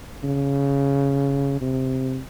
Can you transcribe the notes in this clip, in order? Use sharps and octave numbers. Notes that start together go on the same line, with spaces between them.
C#3
C3